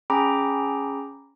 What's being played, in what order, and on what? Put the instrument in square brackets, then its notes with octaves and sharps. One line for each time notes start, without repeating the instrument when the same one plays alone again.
[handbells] C#4 G#4 G5 A#5 B5 D6